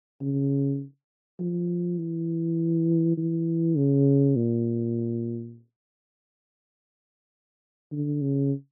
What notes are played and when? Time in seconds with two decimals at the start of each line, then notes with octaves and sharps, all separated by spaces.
0.21 C#3
1.40 F3
1.98 E3
3.17 E3
3.77 C#3
4.36 A#2
7.92 D3
8.21 C#3